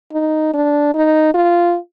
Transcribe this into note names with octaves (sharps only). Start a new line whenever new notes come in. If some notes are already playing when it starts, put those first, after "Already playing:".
D#4
D4
D#4
F4